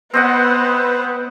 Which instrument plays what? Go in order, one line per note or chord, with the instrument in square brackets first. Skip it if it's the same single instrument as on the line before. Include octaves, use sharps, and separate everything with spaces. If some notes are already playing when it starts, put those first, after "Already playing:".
[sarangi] B3 [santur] C4 D#5 F#5 [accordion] B4 C5